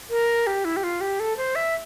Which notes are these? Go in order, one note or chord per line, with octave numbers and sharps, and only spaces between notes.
A#4
G4
E4
G4
F4
G4
A4
C5
E5